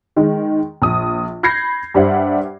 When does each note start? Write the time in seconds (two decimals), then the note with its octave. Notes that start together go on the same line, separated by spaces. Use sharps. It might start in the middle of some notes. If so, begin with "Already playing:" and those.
0.16 D#3 G#3
0.82 A#1 D#6
1.43 B5 G6 G#6 A#6 C7
1.94 G2 G3 C5 E5 F#5